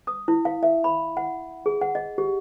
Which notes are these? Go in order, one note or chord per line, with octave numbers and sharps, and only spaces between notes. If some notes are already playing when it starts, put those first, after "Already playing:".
D#6
E4
F5
E5
B5
F#5
G#4
F#5
D#5
G4